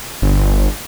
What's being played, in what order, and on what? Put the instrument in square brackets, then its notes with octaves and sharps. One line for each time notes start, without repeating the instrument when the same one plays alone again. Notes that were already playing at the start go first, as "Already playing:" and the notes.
[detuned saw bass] G1